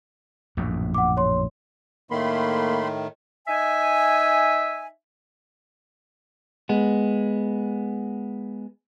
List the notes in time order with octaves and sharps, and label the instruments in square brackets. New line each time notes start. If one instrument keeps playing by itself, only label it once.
[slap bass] A#1 F#2 A2
[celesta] F#5 D6
C#5 C6
[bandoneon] A2 D#3 [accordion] A3 B5 C6 [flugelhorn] A#3
[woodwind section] D#4 E5 G#5
[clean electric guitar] G#3 B3